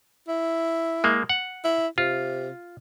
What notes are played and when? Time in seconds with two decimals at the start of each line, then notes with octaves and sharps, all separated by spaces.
0.28 E4
1.04 G#3 A#3
1.29 F#5
1.64 E4
1.98 C3 F4